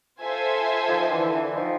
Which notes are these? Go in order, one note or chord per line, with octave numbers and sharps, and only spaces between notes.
F4 A4 C5 E5 G#5
D#3 F3
D3 E3
D3 E3
E3
D#3 F3